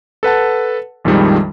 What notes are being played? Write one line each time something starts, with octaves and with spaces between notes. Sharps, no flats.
A4 B4 F#5 A5
A#1 F2 D#3 F3 G3 G#3